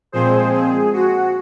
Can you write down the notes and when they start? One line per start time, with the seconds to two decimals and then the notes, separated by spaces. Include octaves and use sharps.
0.12 A#2 F3 G#3 C4 G#4 C5
0.53 G#4
0.93 F#4